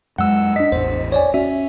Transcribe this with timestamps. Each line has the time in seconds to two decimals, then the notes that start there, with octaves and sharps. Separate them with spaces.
0.18 F#2 G#3 F#5 E6
0.56 D4 D#5 B6
0.72 A1 E2 C5
1.12 C#5 D5 G#5
1.34 C#4 F#4 E5